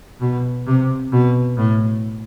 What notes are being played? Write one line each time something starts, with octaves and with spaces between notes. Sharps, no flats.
B2
C3
B2
A2